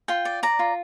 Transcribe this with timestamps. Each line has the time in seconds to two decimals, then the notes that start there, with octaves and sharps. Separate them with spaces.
0.08 F4 G5
0.25 D5
0.43 D5 A#5
0.59 F4